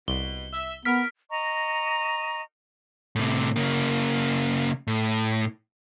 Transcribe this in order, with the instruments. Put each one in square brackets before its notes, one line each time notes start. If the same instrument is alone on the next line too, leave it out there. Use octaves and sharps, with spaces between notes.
[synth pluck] C2 [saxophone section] B2 [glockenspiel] G7
[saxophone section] E5
[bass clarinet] B3 [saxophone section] A#4 [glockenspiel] F6 B6
[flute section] D#5 A#5 C#6
[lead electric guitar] A2 C3
C#3 A#3
A2